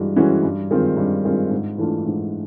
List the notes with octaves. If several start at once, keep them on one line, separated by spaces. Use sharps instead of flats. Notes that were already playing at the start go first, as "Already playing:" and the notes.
Already playing: G2 E3 G#3 F#4
E3 G#3 C#4 F#4
G2
D#3 G#3 C4 F4
G2
D#3 G#3 C4 F4
G#2
E3 A3 D4 F4
G#2